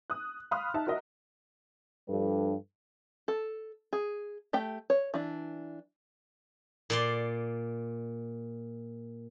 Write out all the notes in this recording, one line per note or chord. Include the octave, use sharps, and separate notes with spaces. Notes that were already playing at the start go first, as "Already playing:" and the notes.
D#6 F#6
F5 B5 C6 D#6 F6 F#6
D#4 E5 A5
F#4 A#4 D#5 E5
G2 F3 G3 D4 A4 B4
A4
G#4
A3 G4 G5
C#5
E3 D4
A#2 D5 C6